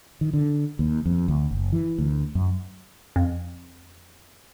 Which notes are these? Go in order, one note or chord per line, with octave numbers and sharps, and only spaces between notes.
D#3
D3
D#2
F2
D2
F#1
E3
D2
F#2
F2